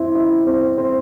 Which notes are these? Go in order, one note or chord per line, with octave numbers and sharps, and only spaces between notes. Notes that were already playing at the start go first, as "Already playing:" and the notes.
Already playing: C4 E4
E4
C4
C4